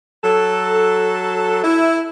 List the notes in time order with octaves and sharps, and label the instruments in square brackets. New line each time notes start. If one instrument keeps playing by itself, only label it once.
[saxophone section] F#3 A4
E4